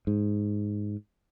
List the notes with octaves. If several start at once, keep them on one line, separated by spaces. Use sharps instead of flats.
G#2